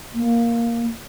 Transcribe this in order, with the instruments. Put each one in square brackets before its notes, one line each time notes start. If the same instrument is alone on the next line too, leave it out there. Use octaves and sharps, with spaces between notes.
[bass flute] A#3